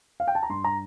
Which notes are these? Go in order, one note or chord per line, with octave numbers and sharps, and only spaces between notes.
F5
G5
A5
A#5
G2 C6
A#5